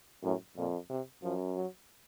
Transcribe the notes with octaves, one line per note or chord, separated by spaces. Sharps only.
F#2 A2
F2 A#2
C3
F#2 F3
F#3